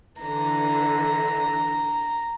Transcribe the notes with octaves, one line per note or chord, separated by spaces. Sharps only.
D3 E3 A#5